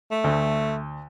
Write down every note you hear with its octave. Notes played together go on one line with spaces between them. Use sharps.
A3
D2